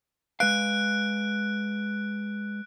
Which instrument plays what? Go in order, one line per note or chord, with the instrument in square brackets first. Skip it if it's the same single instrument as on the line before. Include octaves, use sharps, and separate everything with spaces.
[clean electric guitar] G#3 B4 F5 [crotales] F#6 D7